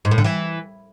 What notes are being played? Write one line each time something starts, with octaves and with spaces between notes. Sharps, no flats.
G#2
A2
D3
E3